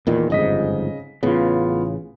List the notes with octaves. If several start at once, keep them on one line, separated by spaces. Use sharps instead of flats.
E2 A#2 D#3
G1 F2 G#2 C#3 D#5 B6
A1 C#3 B3 F4